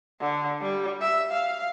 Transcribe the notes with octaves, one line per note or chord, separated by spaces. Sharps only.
D3
G3
E5
F5